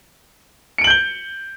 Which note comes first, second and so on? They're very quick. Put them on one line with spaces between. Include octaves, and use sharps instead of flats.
C#7 D7 F#7 G6 G7